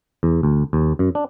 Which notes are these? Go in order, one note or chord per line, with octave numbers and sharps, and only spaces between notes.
E2
D2
D#2
F#2
D4